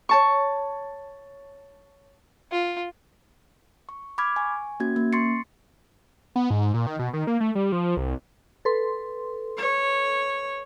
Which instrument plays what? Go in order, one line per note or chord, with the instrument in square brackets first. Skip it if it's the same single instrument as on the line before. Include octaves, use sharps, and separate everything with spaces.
[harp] C#5 A5 C#6
[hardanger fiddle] F4
[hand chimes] C#6
B5 D6 F6 G#6
G#5 C#6
A#3 C#4 F#4 G#6
A#3 C#4
C6 C#6 A6 C7 C#7
[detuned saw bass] B3
G#2
A#2
D#3
B2
D#3
A#3
A3
G3
F3
C2
[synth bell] A4 B4 C6
[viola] C#5